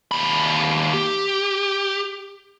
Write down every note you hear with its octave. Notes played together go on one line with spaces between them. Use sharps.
D#2 B5
G4